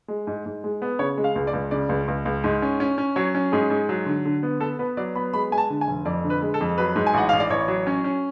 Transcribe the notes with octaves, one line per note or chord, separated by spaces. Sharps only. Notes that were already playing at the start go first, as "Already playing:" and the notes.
G#3
G#2
G#2
G#3
B3
C#3 C#5
G#3
F5
C#2
D5
C#2
C#3 D5
C#2
C#2
C#2
G#2
C#4
C#4
C#4
F#3 C#5
C#4
G#2 G#4
G#2
F#3
D3
D3
B3
B3 A4
B3 B4
F#3 D5
B3 B5
G#3 B5
G#3 G#5
A5
D3
G#5
F1
F2 D5
D3
B4
G#3
A4
F2
F#3 B4
G#2
G#5
A1 F#5
A1 F5
D5
A1 C#5
F#3
C#4
C#4